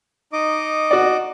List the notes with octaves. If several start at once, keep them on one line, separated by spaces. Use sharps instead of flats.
D#4 D#5 D6
F#4 D5